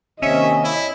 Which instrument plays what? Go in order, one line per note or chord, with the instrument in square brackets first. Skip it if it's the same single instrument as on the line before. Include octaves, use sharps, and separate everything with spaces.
[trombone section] D#2 C3 [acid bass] C#4 [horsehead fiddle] D#5 [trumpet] E5
[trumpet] E4